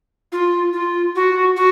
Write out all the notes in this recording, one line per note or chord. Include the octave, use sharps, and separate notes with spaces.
F4
F4
F#4
F#4